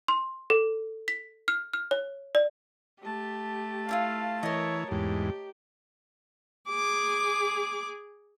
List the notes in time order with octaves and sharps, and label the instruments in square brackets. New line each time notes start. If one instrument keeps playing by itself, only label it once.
[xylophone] C6
A4
B6
F6
F6
C#5
D5
[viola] A3 A5 [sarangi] G4
[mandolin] D4 E4 F4 [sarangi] F5
[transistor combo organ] E3 [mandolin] A#4 D#5 [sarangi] C#5
[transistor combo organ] E2 G#2 [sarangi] G4
[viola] G#4 D6